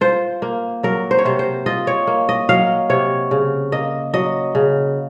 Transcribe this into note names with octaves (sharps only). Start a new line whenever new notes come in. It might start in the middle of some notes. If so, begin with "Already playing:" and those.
F4 C5
A#3
F#3 A#4
C5
C#5
C3 C5
C5
F4 D#5
C#5
A#3
D#5
F#3 F5
C3 C#5
C#3
A#3 D#5
F#3 D#5
C#3